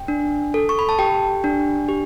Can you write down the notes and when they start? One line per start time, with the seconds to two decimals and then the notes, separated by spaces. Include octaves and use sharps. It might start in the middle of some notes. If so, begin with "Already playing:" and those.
Already playing: G5
0.08 D4
0.54 A4
0.69 C#6
0.79 B5
0.89 A5
0.99 G4 G5
1.44 D4
1.89 G4